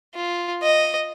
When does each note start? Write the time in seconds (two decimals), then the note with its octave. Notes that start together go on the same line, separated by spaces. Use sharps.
0.15 F4
0.62 D#5